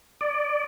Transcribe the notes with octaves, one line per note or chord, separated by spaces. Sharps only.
D5